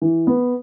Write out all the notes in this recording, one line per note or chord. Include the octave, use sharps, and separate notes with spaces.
E3
B3